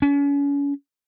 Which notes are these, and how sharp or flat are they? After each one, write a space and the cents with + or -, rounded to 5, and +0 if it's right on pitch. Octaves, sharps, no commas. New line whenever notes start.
C#4 +35